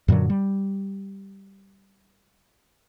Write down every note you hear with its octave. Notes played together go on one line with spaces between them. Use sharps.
F#2 A#2 D3 F#3
G3